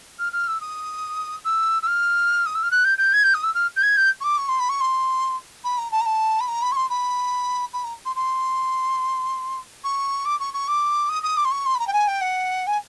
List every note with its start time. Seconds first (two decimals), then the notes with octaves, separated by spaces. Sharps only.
0.19 F6
0.33 F6
0.47 E6
0.61 D#6
1.45 E6
1.82 E6
1.87 F6
2.46 D#6
2.55 E6
2.63 F6
2.71 F#6
2.85 G6
2.98 G6
3.13 G#6
3.24 G6
3.34 D#6
3.43 E6
3.54 F6
3.76 G6
3.82 G#6
3.97 G6
4.21 C#6
4.24 D6
4.38 C#6
4.49 C6
4.60 B5
4.69 C#6
4.81 C6
5.64 B5
5.78 A#5
5.92 A5
6.01 A#5
6.06 A5
6.40 B5
6.48 A#5
6.62 B5
6.72 C#6
6.76 C6
6.90 B5
7.73 B5
7.84 A#5
8.05 C6
8.16 C6
9.84 C#6
10.25 D6
10.40 C#6
10.54 C#6
10.68 D6
11.09 D#6
11.23 D#6
11.37 D6
11.45 C6
11.51 C#6
11.66 C6
11.75 B5
11.79 A#5
11.87 G5
11.93 G#5
12.07 G5
12.21 F#5
12.67 G#5